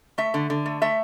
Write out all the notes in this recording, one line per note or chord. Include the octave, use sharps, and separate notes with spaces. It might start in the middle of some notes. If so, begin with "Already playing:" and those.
A3 E5
D3
D3
A3
A3 E5